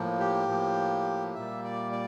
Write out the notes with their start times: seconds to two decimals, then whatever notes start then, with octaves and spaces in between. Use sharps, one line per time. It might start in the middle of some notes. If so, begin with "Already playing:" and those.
Already playing: A2 F3 A#3
0.20 G4
0.48 A2 F3 A#3
1.34 A#2 G3 A#3 E5
1.64 D5
1.92 D5